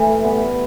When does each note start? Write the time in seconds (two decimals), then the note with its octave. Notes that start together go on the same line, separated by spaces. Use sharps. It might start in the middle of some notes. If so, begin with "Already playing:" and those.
Already playing: E3 A3
0.24 G3 B3